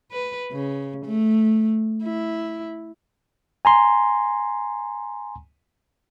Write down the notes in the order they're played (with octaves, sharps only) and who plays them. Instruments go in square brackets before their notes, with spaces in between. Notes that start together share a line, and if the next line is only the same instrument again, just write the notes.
[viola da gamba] B4
C#3
A3
E4
[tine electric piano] G#5 A#5 C6